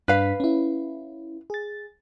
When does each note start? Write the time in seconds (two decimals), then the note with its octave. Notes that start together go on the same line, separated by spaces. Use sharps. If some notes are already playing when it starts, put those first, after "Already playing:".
0.08 G2 D4 B4 F5 B6
0.40 C#4 E4
1.50 G#4 A6